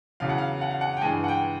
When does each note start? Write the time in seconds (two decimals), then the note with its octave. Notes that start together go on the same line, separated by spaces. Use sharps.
0.20 E2 C#3 F#3 F5
0.29 F#5
0.38 F5
0.61 F#5
0.71 F5
0.81 F#5
0.97 G5
1.02 G2 E3 G#3 G#5
1.24 F#5
1.28 G5